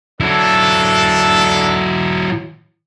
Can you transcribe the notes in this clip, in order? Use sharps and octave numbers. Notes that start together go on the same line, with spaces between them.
F#3 D4 E4 A4